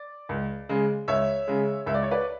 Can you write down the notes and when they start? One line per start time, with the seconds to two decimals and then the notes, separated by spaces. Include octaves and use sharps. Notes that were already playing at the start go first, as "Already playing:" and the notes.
Already playing: D5
0.29 C#2
0.69 C#3 G#3
1.08 C#2 C#5 E5
1.47 C#3 G#3
1.86 C#2 E5
1.94 D5
2.03 C#5
2.11 B4 D5